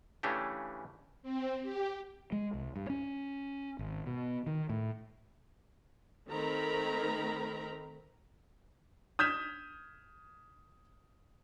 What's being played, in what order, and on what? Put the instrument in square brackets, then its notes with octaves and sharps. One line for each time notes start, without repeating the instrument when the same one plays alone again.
[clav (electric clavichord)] C#3 E3 A3 C#4 D4 G4
[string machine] C4
G4
[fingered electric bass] G#3
C2
G2
C#4
G#1
B2
D#3
A2
[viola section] D#3 A3 C4 A#4 A#5 B5
[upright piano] D#6 F6 G6 G#6 B6 E7